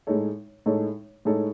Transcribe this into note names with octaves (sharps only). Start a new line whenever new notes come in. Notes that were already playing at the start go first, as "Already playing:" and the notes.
A2 G#3 D#4 A4 C#5
A2 G#3 D#4 A4 C#5
A2 G#3 D#4 A4 C#5